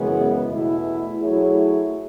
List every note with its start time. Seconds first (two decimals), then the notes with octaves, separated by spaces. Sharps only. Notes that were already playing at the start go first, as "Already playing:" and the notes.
Already playing: F#2 C#3 E3 G#3 B3
0.47 E2 B2 A3 E4
1.21 F#3 A3 E4 G#4 C#5